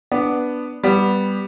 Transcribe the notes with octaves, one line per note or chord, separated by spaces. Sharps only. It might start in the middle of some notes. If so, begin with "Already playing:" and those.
B3 D4
G3 B3